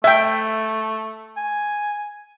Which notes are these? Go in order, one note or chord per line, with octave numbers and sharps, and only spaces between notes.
A3 E5 G5
G#5